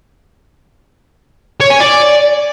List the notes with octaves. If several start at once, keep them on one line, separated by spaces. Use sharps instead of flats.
C#5
G#5
D5